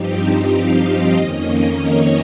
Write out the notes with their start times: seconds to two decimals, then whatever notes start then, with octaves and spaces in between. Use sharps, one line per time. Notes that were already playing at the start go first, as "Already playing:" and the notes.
Already playing: G2 F3 C4 D#4 G4
0.16 G4
0.49 F5
0.81 D#5
1.15 F2 D#3 A#3 C#4
1.80 C#5